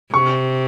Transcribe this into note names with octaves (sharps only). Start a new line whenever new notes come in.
C3 C#6